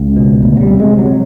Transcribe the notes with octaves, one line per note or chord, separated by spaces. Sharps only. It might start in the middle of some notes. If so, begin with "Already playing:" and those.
Already playing: C#2
B2
D2
F#3
G3
C3
G#3
C3
F#3